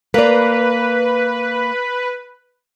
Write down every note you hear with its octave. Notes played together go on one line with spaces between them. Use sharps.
A#3 B4 D5